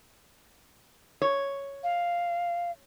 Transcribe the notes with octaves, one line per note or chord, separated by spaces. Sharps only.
C#5
F5